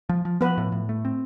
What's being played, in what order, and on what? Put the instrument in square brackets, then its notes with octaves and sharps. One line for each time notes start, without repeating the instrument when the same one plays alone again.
[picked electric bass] F3
F3
[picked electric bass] F3 [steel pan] B3 B4
[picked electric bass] A2
A2
A3
C4